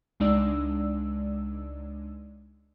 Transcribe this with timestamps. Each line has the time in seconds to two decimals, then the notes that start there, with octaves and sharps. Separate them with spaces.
0.20 C#2 G#3 D4 D#4 D5 E6